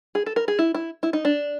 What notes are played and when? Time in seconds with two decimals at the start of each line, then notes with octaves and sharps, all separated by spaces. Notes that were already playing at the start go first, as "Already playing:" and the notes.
0.15 G#4
0.26 A4
0.36 A#4
0.48 G#4
0.59 E4
0.75 E4
1.03 E4
1.13 D#4
1.25 D4